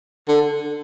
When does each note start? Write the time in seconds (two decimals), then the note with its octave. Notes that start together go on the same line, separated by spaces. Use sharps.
0.28 D3